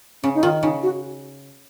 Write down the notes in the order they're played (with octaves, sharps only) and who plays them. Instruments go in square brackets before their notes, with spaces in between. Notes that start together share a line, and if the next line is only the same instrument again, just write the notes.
[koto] C#3 [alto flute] C#4
[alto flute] D#4
[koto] D#3 [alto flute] F4
[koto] C#3 [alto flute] D#4
[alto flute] F#4